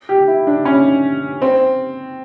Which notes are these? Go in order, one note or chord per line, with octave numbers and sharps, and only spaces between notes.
G4
E4
D4
C#4
C4